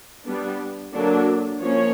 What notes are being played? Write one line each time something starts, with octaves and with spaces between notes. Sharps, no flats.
G3 B3 D4
D3 F#3 A#3 D4
F3 A#3 C#4 C#5